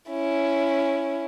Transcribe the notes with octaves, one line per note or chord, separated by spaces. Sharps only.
C#4 E4